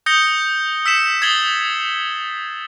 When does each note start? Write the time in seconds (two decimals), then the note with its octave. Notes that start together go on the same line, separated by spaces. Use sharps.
0.06 D#6 G6 A#6 C#7 G7
0.86 E6 B6 C#7 E7
1.22 D#6 G#6 A6 C7 F#7 G7